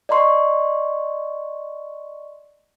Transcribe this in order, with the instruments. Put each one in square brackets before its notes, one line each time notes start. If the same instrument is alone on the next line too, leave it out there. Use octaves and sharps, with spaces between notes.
[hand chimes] D5 D#5 A#5 C6 C#6